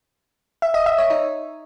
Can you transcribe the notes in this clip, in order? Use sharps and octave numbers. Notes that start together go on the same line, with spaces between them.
E5
D#5
E5
C#5
D#4